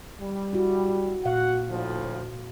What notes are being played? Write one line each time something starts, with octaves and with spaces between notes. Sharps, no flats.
G3
E4 F#4
A#2 F#4 F5 F#5
D2 A2 F3